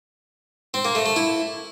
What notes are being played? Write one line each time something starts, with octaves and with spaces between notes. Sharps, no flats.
C4
A#3
A3
A3
E4